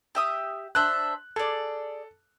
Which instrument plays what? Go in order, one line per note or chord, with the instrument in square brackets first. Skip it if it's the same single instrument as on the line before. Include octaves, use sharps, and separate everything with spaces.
[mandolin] G4 E5 D#6
[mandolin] D4 C5 E5 [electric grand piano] F#6
[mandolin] G#4 D5 [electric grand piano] A4